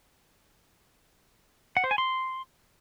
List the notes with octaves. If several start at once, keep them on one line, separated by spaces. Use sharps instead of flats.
F#5
C5
G#5
C6